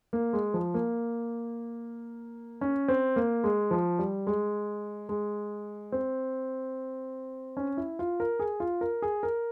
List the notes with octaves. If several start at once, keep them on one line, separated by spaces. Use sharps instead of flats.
A#3
G#3
F3
A#3
C#4
C4
A#3
G#3
F3
G3
G#3
G#3
C4
C#4
E4
F4
A#4
G#4
F4
A#4
G#4
A#4